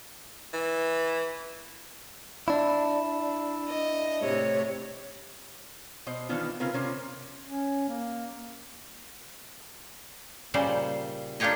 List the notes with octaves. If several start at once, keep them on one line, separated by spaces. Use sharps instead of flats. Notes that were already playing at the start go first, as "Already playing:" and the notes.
E3
D4 E4
D#5
A2 C3 C#5
B2 C5 D#5
D#3 E3 B3 D4 F4
C#3 C4 F4 A#4 B4
C3 C#4 F4 A#4 C5
C#4
A#3
A#2 C#3 G3 C5
A#3 D4 F4 G4 C#5 D#5